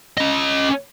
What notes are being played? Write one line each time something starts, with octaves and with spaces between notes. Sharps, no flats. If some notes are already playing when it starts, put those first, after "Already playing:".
C#4 D#5